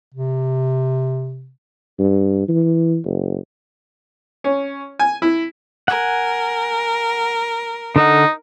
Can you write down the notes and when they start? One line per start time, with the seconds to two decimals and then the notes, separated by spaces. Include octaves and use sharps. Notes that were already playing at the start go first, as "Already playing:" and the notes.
0.14 C3
1.99 G2
2.48 E3
3.05 F#1
4.44 C#4
4.99 G#5
5.22 E4
5.88 A#4 F#5 G#5
7.96 D3 D#4 A4 F#5